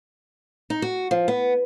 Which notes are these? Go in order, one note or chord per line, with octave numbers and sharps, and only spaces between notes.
D#4
F#4
F3
B3